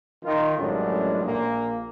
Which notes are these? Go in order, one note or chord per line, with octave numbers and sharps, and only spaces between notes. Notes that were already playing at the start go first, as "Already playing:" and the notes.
D#3 F4
A1 F#2 A2 G3 G#3 D4
A#1 A#2 A#3